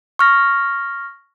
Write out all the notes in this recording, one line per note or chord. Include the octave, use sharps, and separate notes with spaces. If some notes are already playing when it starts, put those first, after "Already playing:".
C#6 F6 A#6